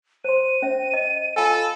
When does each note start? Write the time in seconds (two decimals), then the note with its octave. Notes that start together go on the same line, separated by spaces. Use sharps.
0.24 C5 C6 D#7
0.62 C#4 C5 E5
0.94 D#5
1.37 F4 A4 F5 G#5